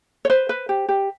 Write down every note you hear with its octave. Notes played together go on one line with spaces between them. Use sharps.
C#5
B4 C5
B4
G4
G4